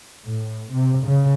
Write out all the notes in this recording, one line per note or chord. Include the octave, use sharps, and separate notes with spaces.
A2
C3
C#3